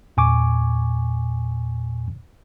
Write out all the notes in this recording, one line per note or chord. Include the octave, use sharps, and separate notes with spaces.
E2 A#2 G#5 C#6 D6